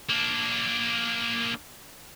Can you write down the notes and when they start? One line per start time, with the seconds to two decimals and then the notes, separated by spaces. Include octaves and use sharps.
0.10 A#3 D4